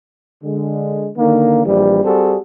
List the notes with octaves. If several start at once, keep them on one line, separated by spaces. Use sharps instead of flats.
D3 G#3
D3 D#3 A#3
A#1 E3 G3
G3 C4 F#4 G#4 A4